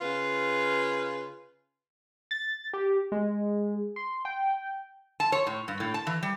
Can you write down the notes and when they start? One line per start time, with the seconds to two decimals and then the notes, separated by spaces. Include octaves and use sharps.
0.01 C#3 F4 B4
2.31 A6
2.73 G4
3.12 G#3
3.96 C6
4.25 G5
5.20 A5
5.32 C#5
5.47 A2
5.68 G2
5.80 A2
5.94 A5
6.07 E3
6.23 G3